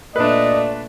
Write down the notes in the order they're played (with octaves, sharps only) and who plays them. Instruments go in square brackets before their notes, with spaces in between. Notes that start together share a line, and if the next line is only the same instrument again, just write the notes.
[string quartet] A#2 A3 [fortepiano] D4 B4 [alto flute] D5 [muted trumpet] D#5